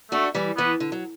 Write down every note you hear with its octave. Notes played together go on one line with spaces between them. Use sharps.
A3 D4 F#4
E3 G3
E3 B3
D3
F#3